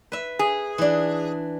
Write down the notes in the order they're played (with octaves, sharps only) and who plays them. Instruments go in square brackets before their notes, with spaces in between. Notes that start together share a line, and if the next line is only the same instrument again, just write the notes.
[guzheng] B4 E5
[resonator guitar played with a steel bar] G#4
[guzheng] E3 D4